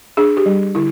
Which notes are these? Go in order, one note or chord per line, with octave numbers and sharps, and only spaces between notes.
D4 G#4
G4
G3
D3 E4